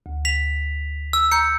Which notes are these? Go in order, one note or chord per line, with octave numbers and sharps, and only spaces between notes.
D2
B6 F7
E6
A#5 G6 C#7